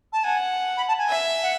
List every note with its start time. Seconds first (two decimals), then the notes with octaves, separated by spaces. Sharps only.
0.13 A5
0.24 F#5 G#5
0.77 B5
0.88 A5
0.98 G#5
1.09 E5
1.42 F#5